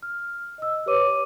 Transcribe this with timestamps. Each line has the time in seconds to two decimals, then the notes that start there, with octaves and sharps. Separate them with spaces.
0.03 F6
0.58 D#5 E6
0.86 G4 B4 C#5 D6 D#7